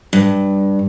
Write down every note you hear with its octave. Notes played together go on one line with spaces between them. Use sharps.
G2